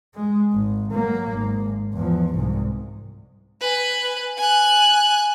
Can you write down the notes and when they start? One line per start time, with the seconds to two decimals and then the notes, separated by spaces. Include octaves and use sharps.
0.15 G#3
0.53 G#1
0.93 F#3 A#3
1.30 G#1
1.93 E2 F3
2.34 C2 G#2
3.61 B4 G#5
4.37 G#5 F#6